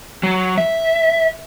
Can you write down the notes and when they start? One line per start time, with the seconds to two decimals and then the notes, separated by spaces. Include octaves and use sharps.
0.23 F#3
0.58 E5